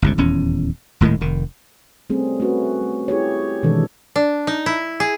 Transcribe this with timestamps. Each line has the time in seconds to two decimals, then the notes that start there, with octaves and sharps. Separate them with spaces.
0.02 G1 C#2 C3
0.18 D#1 E2 C#4
1.01 D#1 A2 D#3 G#3
1.21 F1 D#3
2.10 G3 A3 C4 C#4 G#4
2.40 A3 C#4 F#4 B4
2.81 G3
3.08 E4 G4 G#4 C#5
3.63 B2 D#3 E3 G#3 D4 A4
4.16 D4
4.47 D#4
4.66 E4
5.00 G#4